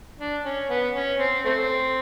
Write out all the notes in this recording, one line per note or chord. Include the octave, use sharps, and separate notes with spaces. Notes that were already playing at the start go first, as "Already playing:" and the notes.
D4
C#4
B3
C#4
C4
A3 C4